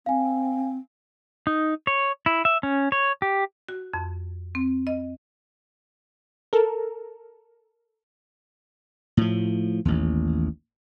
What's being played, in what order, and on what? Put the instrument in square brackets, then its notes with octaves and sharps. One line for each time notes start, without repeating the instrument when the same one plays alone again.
[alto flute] C4 [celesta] F5 G#5
[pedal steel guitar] D#4
C#5
E4
E5
C#4
C#5
G4
[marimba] F#4
F2
C4
D#5
[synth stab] A4 A#4
[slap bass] A2 F3
A1 D#2